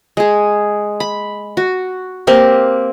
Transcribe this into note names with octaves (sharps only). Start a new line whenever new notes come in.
G#3 G#4
B5
F#4
A#3 C4 G4 A#4